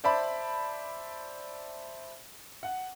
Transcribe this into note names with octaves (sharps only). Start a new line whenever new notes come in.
C5 D5 E5 A5 B5
F#5